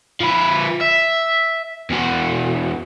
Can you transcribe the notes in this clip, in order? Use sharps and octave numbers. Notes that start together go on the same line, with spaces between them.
F3 B4
E5
E2 F#4